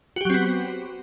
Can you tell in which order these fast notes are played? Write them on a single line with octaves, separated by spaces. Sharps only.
F#4 G4 F#3 C4 B3